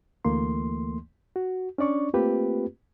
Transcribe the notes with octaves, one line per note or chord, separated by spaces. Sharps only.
D2 E3 A3 A#3 C6
F#4
C#4 D4 D5 C#6
A3 A#3 C4 F4 G4 B4